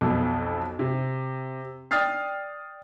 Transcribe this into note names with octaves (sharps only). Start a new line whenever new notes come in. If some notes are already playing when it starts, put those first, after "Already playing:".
B1 F2 B2 A4
C3
D5 G5 D#6 F6 A6 C7